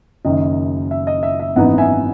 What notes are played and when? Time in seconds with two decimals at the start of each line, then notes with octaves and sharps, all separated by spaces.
0.25 F#1 F#2 D#3 D#5
0.91 E5
1.07 D#5
1.23 E5
1.40 E5
1.56 G#1 F#2 E3 B3 D#4 D#5 F#5
1.78 E5 G#5